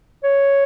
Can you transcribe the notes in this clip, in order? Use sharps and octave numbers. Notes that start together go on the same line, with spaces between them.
C#5